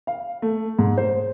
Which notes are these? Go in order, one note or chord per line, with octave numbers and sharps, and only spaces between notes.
F5
A3
G#2
C5